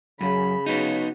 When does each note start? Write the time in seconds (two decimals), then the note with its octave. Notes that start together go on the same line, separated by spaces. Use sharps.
0.21 F#2 C#3 B5
0.66 B3 D#4 F#4